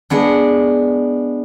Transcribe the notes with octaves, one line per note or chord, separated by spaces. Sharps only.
G#3 B3 D4